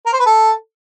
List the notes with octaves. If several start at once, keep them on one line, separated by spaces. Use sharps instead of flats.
A#4
C5
B4
A4